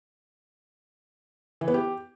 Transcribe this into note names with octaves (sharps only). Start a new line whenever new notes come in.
E3
B3
G4